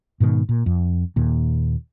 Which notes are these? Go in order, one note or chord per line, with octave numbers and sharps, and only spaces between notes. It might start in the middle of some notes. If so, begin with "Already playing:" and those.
G#2 B2 D3 D#3
A#2
F2
D#2 A#2